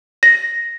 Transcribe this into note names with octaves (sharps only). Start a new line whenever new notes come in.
A#6